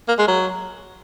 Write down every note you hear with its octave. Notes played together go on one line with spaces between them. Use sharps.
A#3
G#3
F#3